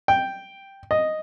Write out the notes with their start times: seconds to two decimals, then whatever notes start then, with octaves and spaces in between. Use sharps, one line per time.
0.08 G5
0.91 D#5